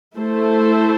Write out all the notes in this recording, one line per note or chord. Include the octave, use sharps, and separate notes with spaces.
A3 E4 A4 C5